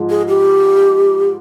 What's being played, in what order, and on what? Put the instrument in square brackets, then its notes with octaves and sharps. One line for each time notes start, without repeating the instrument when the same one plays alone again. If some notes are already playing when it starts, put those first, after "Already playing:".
Already playing: [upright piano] G#2 F3 G#3
[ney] G#4
G4